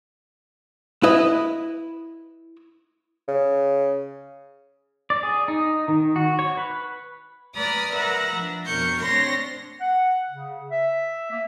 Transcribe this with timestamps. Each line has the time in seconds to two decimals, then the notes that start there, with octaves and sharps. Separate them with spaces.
1.03 E4 B4 D#5
3.28 C#3
5.10 D5
5.23 G#4
5.48 D#4
5.88 D#3
6.16 F#4
6.39 C#5
6.57 B4
7.55 B4 D5 A#5 B5 D#6 F6
7.92 A#4 B4 E5 F#5 A#5 B5
8.31 F3 D4
8.65 F2 B2 D4 A#4 C#6 G6
9.02 A3 C4 D4 C#5 C6 A#6
9.81 F#5
10.30 C#3
10.71 E5
11.31 A#3